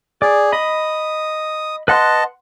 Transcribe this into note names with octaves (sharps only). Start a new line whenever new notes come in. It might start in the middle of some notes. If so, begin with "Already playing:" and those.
G#4 D5
D#5 B5 D#6
B4 D#5 F#5 A5 C6